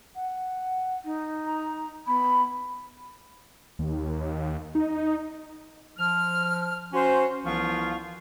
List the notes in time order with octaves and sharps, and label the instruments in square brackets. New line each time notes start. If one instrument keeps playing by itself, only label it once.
[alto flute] F#5
[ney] D#4
[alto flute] A#5
[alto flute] B3 [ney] B5
[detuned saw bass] D#2
D#4
[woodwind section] F3 F6
C#4 F#4 C5
C2 E3 F3 B3 F4 C#6